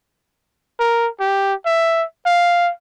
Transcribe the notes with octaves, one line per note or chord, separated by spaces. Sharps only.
A#4
G4
E5
F5